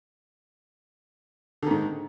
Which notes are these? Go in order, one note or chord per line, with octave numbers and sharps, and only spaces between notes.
G#2 D3 D#3